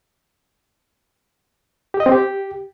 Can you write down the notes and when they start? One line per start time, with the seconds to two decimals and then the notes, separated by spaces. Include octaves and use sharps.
1.94 G4
2.00 D#5
2.06 C4
2.12 G4